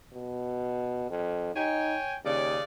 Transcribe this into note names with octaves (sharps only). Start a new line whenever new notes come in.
B2
F2
D#4 C#5 G5 G#5
D#2 C#3 D5